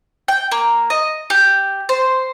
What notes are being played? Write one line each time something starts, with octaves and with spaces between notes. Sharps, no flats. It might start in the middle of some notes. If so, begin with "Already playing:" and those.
G5
A#3
D#5
G4
C5